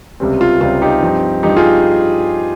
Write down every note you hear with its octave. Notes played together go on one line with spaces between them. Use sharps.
C#2 C3 G3 C4
F4
C#2 C3 G3 C4 F4
D#4 G4
G2 F3 C4
G2 F3 C4 D#4 G4
F4 G#4